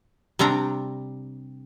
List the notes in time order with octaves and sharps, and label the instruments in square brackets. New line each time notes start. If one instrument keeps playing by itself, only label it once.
[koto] C3 G3 C4 D4 A#5